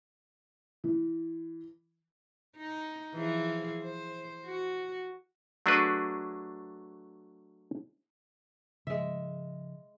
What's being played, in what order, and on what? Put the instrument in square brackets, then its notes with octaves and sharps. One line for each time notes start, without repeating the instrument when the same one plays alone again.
[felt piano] E3
[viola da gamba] D#4
E3 F3 G#4
C5
F#4
[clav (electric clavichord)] F#3 A3 D4 F#4 G#4 B4
[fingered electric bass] C#3 F3 [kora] G#3 E5